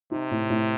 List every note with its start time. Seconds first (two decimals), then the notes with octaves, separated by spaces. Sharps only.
0.11 C3 D#4
0.31 A2
0.50 A2